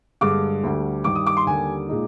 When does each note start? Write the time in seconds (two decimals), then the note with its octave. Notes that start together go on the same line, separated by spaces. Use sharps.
0.21 G2 D3 G#3 D6
0.63 D2 D3 G3
1.04 G2 D#3 G3 D6
1.15 D#6
1.26 D6
1.37 C6
1.46 D#2 D3 G3 G#5
1.88 A#2 G#3 D#4